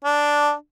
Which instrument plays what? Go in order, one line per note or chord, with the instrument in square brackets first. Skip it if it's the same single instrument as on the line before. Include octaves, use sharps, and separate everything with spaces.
[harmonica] D4